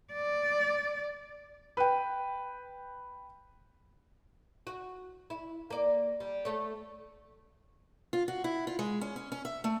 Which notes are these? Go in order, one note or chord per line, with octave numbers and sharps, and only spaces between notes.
D5
B4 G5
F#4
E4
A#3 D5
G3
A3 C#5
F4
F#4
E4
F4
G#3
C#4
C#4
C#4
E5
A3